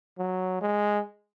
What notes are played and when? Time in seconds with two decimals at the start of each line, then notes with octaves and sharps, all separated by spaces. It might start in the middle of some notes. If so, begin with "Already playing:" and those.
0.19 F#3
0.61 G#3